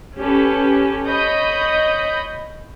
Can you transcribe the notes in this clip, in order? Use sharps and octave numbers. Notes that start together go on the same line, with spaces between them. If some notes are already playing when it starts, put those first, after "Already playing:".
C#4 G4 A4 B4
C#5 D#5 B5 D#6 G6